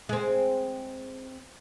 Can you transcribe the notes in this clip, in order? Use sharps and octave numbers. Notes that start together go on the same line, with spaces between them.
G#3 C4